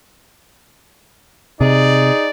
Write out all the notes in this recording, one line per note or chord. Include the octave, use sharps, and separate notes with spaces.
C3 D#4 G#4 D5